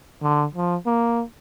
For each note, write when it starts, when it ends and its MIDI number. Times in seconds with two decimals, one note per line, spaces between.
0.23 0.45 50
0.55 0.76 53
0.86 1.22 58